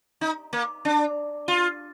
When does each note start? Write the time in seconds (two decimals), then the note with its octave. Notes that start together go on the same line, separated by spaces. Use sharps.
0.21 D#4
0.53 A#3
0.85 D4
1.48 F4